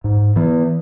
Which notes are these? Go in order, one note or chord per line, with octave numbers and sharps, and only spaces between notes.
G#2
E3 B3